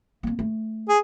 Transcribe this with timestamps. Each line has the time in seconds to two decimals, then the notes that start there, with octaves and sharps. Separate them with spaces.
0.23 A#3 C4
0.39 A3
0.89 G#4